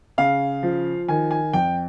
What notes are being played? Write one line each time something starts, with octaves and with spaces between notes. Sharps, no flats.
C#3 F5
F3
D#3 G#5
G#5
F2 G5